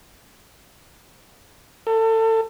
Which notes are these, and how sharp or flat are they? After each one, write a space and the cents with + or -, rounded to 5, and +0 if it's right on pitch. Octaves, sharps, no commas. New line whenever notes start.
A4 +30